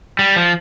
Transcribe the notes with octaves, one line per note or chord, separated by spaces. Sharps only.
G3
F3